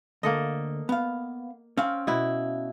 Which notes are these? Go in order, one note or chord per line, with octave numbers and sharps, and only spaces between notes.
D2 A#3 A4 D#5
B3 F5
C4 C#4 F5
B2 E4